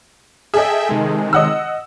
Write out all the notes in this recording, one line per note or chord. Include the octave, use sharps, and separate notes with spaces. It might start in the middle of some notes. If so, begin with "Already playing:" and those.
G#4 A4 D#5 E5 G5
C3 D#3 G#3
D#5 F#5 E6